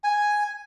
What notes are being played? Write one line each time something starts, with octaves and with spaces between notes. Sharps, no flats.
G#5